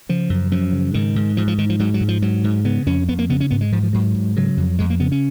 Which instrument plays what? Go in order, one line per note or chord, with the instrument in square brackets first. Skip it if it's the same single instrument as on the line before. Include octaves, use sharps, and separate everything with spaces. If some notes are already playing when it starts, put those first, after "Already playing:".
[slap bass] C#3 F3
F#2
F#2 F3
C#3
G#2 D#3
G#2
G#2 F3
F3
G#2 D#3
F3
G#2 F#3
F#3
G#2
F3
G#2 F#3
G#2
C#3 B3
F2 C#4
F2 B3
A#3
C#3 B3
C#4
G#2 B3
G#3
G#2 F3
F3
G#2 F#3
G#2
C#3 F#3
F2
F2 G#3
A#3
C#3 B3
C#4